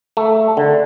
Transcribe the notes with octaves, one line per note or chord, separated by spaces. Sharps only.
A3
D3